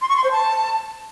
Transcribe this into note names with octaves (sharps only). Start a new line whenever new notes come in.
C6
C#6
C6
C5
A5